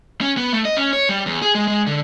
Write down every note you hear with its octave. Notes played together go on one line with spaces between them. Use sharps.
C#4
B3
A3
D#5
C#4
C#5
G3
E2
G#4
G#3
G#3
D3